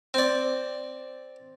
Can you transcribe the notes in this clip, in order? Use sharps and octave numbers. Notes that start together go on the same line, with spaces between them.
C4 D5